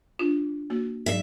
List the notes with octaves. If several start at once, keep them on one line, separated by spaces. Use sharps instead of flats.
D4 F4
A#3 F#4
G#2 F#3 D5 E5